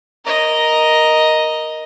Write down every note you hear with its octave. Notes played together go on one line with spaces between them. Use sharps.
A#4 D#5